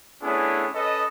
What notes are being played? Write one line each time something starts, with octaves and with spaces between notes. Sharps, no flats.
A3 B3 C#4 D4 E4 G#4
C#4 A4 B4 D#5